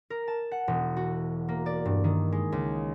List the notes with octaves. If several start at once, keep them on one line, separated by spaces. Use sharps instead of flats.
A#4
A5
F#5
E1
F#4
A#3
D5
G2
D#3
G#3
C#2